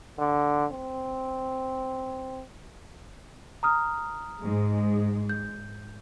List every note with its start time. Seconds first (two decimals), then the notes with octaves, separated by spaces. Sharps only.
0.19 D3
0.71 C4
3.63 A#5 D#6 F6
4.41 G#2 G#3
5.29 G6